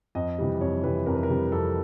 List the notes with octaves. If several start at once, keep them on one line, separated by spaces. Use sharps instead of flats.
F2 D#5
C3 E3 G3
F2 C#5
C3 E3 G3 B4
F2 A#4
B4
A#4
C3 E3 G3
F2 A4